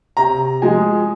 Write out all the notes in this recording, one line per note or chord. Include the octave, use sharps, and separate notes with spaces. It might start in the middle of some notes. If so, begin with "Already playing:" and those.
C3 A#5
F3 G#3 G#5